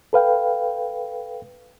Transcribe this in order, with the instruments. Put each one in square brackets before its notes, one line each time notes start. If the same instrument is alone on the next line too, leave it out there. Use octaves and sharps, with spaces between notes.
[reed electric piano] A4 B4 F5 G5